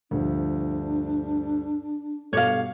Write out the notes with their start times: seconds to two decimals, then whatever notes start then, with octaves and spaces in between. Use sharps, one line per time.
0.11 D2 G2 F3 D4
2.33 G2 B2 A4 C#5 F5 D6